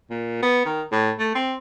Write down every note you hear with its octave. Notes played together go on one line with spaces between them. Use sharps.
A#2
B3
D#3
A2
A3
C4